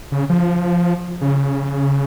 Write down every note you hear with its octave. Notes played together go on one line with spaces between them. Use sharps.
C#3
F3
C#3